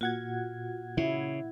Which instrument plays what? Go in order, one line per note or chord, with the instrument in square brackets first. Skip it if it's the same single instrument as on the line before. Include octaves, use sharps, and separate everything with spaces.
[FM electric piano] A#2 F#5 G#6 [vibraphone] F4 F#4
[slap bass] C#3 [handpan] E4